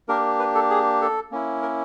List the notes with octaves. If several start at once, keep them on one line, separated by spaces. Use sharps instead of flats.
A#3 D4 G4 A#4
B4
A4
G#4
A4
A#3 C#4 E4
A#4